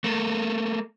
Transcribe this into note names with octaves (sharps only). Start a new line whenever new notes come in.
A3 A#3